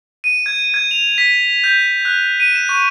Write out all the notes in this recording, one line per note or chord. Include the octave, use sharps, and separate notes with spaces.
D#7
G#6
G#6
F7
B6
G6
F#6
D#7
E7
C#6